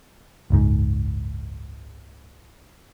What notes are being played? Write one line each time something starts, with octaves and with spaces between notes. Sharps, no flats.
F#1 C#2 G#2